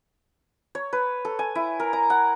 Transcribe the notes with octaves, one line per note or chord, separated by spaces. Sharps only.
C#5
B4
A4
G#5
E4
A#4
A#5
F#5